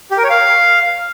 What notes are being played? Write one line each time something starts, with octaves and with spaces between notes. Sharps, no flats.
G4
A#4
C#5
F5